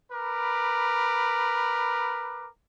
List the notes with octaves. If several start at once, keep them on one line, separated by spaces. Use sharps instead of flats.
A#4 B4 B5 D6